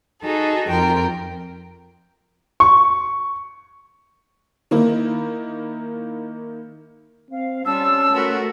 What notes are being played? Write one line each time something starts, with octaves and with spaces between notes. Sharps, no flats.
D#4 F#4 G#4 A4
F2 A#4 G5
C#6
D#3 A#3 E4
C4 F5
G3 C#4 F4 A5 E6
A3 F4 F#4 A#4 B4 F#5